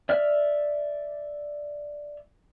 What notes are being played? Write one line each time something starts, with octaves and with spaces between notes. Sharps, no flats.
D5 E5 F6